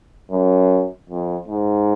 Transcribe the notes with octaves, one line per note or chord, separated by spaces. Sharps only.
F#2
F2
G#2